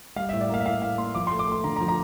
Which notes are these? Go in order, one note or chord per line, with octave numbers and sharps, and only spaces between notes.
G3 F5
E5
A2
D5
A#3 F5
E5
A2 F5
A2 F5
A#3 C6
F3 D6
C6
A3
D6
A3 C6
D3 A#5
A#5
F3
A#5